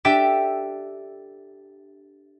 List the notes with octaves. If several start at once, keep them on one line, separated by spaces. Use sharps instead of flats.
D4 G4 A4 E5 G5 D6